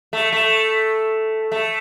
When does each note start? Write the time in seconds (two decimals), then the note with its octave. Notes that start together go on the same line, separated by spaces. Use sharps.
0.13 A3
0.32 A3
1.52 A3